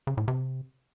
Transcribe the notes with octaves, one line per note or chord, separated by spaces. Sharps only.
C#3
A2
C3